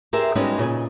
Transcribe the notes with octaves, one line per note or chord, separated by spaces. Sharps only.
G4 G#4 A#4 C5 E5
G3 G#3 B3 C#4 D#4 F#4
A#2 C#3 D#5 G#5